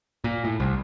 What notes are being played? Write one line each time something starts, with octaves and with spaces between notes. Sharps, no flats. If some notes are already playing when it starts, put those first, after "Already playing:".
A#2
A2
C2